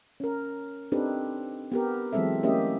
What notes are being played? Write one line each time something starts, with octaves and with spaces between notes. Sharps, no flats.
C#4 A#4
C4 D4 D#4 G4 A4 B4
B3 G4 A#4
E3 F#3 G#3 C4 A4 E5
A3 A#3 C#4 G4 D#5 E5